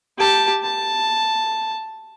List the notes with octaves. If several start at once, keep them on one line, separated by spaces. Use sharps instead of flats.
G4 A5
A5